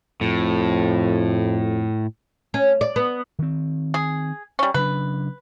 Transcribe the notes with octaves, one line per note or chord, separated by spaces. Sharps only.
F2 A2
C#4
D5
B3
D#3 C4
G#4
G3 C#4
C#3 F#3 D4 B4